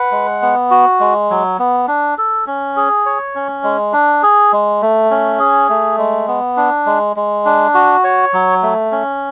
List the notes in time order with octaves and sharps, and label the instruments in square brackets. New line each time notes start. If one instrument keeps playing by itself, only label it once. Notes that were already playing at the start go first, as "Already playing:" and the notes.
Already playing: [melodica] B4 F#5
G#3
B3
F#4
G#3
F#3
B3
D4
A4
C#4
G#4
C#5
C#4
G#3
D4
G#4
G#3
A3
C#4
G#4
A3
G#3
B3
D4
G#3
G#3
D4
F#4
C#5
F#3
A3
C#4